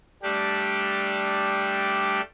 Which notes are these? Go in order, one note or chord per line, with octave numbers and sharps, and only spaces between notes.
G3 A3 D4 G4